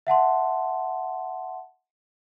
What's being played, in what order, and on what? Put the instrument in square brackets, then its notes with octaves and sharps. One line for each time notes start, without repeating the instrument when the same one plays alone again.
[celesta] E5 F#5 A5 C6